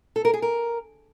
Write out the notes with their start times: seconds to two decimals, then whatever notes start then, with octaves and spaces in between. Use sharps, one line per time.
0.16 A4
0.25 A#4
0.34 G#4
0.42 A#4